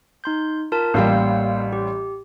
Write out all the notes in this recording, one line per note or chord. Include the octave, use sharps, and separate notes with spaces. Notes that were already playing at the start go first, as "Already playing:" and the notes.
D#4 C6 G6
F4 A#4 A5
A1 G3 A#3 F5 E6
G4